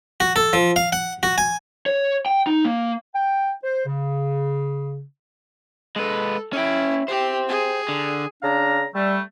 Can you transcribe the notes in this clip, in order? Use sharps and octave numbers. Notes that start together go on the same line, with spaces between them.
F#4
A4
F3
F5
F#5
F#4
G#5
C#5
G5
D#4
A#3
G5
C5
C#3
G#3 A4 B4
C#4 E4 G5
G4 C5 G5
G#4
D3
C#3 D4 D5 F5 A#5
G3 A3